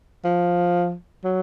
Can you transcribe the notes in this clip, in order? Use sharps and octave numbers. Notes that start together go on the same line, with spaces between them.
F3
F#3